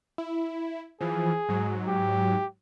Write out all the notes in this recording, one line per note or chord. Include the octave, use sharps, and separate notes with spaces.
E4
E3 F3 G#4
G#2 F#3
G4